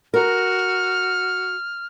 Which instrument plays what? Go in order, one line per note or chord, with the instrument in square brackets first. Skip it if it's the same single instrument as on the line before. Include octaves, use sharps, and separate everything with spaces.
[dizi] F#4 [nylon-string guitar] A#4 [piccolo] F6